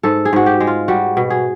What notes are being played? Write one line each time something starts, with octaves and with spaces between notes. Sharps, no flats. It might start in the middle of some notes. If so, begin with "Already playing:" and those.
G#2 A4
G#4
G#2 F#4
G4
G#3
F4
G3 F#4
B2
G#4